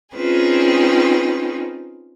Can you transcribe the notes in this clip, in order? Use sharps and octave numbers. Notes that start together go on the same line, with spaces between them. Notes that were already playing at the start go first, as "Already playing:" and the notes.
C4 C#4 D#4 F4 G#4 B4